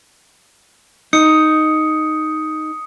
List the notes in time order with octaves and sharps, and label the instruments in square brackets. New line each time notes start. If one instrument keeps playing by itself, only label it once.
[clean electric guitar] D#4 [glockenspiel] D#6 C#7